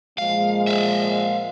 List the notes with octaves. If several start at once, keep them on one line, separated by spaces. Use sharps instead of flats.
A#2 F3 G#3 F5
E5 F5